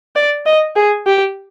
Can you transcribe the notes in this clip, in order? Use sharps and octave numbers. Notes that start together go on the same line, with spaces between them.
D5
D#5
G#4
G4